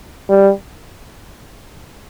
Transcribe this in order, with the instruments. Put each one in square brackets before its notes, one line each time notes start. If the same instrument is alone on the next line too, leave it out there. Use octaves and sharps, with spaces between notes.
[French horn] G3